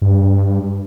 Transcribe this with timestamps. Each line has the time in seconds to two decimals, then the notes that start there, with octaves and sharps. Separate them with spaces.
0.02 G2